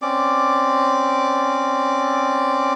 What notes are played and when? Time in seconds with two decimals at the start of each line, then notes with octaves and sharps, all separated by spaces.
0.02 C4 C#4 D5 D6